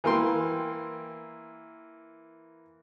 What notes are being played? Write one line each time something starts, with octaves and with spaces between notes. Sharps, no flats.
E3 A#3 G5 C6